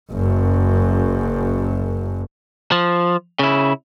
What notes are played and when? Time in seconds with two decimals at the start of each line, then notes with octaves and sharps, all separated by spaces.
0.11 F#1 F#2
2.72 F3
3.39 C#3 E4